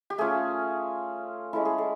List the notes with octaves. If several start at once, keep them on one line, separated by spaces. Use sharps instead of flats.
G4
A3 C#4 F4 G#4
G#3 C#4 E4 A4
G#4
A4